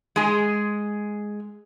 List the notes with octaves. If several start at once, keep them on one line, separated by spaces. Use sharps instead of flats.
G#3 G#4